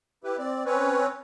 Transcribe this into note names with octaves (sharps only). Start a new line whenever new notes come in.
E4 G4 B4
C4 D5
C4 C#4 B4 C#5